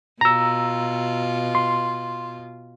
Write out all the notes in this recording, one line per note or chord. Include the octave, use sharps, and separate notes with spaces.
B2 F4 A#5 E6
C6